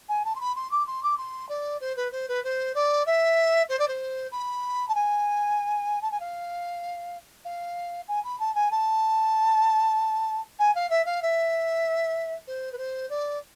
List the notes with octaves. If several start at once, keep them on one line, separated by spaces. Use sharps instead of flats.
G#5
A5
C6
B5
C6
D6
C6
D6
C6
D5
C5
B4
C5
B4
C5
D5
E5
C5
D5
C5
B5
A5
G#5
A5
G#5
F5
F5
G#5
B5
A5
G#5
A5
G#5
F5
E5
F5
E5
C5
B4
C5
D5